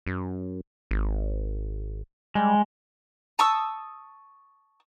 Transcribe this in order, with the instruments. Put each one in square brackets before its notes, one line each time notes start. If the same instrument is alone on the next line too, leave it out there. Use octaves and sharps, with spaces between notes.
[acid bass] F#2
G#1
[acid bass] G3 [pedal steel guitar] G#3
[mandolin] A5 C#6 D#6 E6